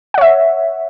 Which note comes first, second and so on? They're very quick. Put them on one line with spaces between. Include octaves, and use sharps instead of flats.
F#5 C#5 E5